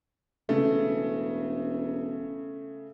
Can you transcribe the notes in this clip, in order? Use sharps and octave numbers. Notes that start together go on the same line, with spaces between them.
E1 C#3 A3